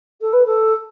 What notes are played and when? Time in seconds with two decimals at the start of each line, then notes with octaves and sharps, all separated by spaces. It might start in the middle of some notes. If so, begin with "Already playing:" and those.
0.21 A4
0.32 B4
0.45 A4